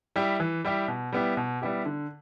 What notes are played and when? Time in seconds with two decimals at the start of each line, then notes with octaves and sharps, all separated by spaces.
0.16 G3 E4 G4
0.40 E3
0.65 G3 E4 G4
0.88 B2
1.13 G3 B3 E4 G4
1.37 B2
1.62 G3 B3 E4 G4
1.85 D3